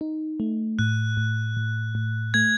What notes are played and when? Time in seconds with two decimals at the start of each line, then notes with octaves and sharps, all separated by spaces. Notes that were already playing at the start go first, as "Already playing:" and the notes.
0.01 D#4
0.40 A3
0.79 A2 F#6
1.17 A2
1.57 A2
1.95 A2
2.34 A3 G#6